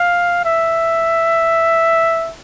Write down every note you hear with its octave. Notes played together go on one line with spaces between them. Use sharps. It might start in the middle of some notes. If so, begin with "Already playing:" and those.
Already playing: F5
E5